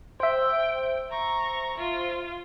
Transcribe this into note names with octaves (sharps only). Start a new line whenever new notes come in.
C5 E5 G5
A#5 C#6
F4